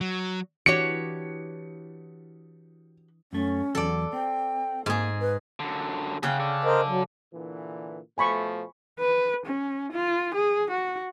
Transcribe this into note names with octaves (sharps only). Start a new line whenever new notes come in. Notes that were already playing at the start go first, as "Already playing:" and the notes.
F#3
E3 D4 E4 F#4 G4 C#5 C#7
F#2 A3 C#4
E2 G2 F#3 A4 D5
C4 G5
G#2 A#3 G#4
B4
F#2 D3
C#3 C#4 G#4 F#5 G5
A4 D5
A#4 C5 D#5
F#3
A#2 D3 E3
B2 F3 A3 G#5 B5 C#6
B4
C#4
F4
G#4
F#4